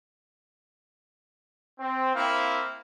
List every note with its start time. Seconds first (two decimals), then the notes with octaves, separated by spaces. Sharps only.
1.79 C4
2.15 A#3 C4 E4 F5